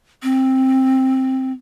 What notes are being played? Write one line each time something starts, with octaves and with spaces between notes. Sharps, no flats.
C4